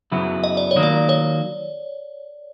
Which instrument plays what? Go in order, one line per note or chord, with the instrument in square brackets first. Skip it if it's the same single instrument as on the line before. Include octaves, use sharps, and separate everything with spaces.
[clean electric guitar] F#2 C#3 F#3 B3 E4
[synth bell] D#5
D5
C#5
[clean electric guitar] D#3 F#3 A#3
[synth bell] D5
C#5